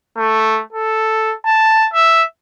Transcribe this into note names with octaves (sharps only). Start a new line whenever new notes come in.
A3
A4
A5
E5